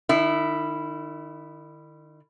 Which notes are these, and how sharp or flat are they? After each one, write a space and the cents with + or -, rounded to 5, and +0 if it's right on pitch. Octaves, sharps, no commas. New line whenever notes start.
D#3 -40 E4 +0